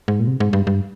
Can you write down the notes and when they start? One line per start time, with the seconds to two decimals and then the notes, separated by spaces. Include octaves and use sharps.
0.08 G#2
0.20 A#2
0.27 C3
0.40 G#2
0.53 G2
0.67 G2